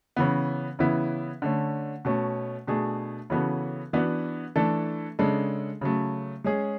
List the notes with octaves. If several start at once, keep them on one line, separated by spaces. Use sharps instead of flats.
C#3 E3 B3
C#3 E3 B3 E4
D3 A3 C#4
B2 A3 C#4
B2 A3 D4 G#4
C#3 E3 B3 F#4 A4
E3 B3 D4 F#4
E3 A3 D4 A4
C#3 G#3 D4 A4
C#3 F#3 A3
G#3 C#4 G#4